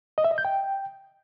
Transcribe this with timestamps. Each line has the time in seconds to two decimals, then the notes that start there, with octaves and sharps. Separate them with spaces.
0.18 D#5
0.24 E5
0.31 D#5
0.38 G6
0.45 G5